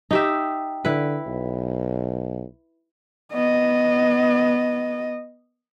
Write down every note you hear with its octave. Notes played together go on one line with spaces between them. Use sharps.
D#4 G4 E5
D3 E4 B4
B1
B3 D#5